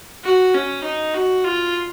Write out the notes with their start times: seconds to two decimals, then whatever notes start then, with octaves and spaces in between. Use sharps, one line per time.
0.24 F#4
0.54 C#4
0.83 D#4
1.14 F#4
1.44 F4